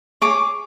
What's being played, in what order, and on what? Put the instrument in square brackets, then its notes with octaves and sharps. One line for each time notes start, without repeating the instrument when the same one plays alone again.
[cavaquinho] G#4 C#5 D6